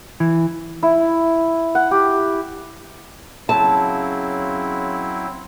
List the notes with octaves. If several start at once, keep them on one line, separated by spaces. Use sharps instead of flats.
E3
E4
F#5
G4
C#3 F#3 C4 E4 A5